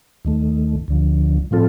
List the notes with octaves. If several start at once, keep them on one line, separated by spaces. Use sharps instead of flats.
D#2 D#3 A3
D2 D3 F3
A2 F3 C4 F4 A4